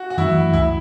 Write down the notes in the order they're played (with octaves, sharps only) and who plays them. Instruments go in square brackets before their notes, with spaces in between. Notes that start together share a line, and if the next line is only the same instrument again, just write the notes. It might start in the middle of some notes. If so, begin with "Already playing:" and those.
Already playing: [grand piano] F#4
F#4
[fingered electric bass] F#2 E3 A3 [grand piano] E4
[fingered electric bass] C#2 [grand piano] E4